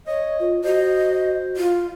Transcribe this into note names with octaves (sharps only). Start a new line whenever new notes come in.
C#5 D#5
F4
F#4 C5 D#5
F4